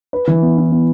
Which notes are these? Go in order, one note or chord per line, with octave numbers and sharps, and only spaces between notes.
B4
E3
B3
E4
B3